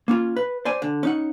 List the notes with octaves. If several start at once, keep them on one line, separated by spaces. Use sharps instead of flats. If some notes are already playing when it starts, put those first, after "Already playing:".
A#3 C#4 F4
B4
C5 D5 G#5
D3
C#4 D#4 F#5